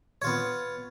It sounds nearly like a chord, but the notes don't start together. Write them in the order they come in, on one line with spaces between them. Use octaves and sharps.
C#5 F4 B3